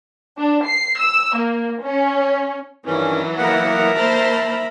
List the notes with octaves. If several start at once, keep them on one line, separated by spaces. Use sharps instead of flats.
D4
C7
E6
A#3
C#4
G2 D#3 E3 F#3 C#4
A#3 B3 A#4 E5 F#5
A#3 C5 A5 B5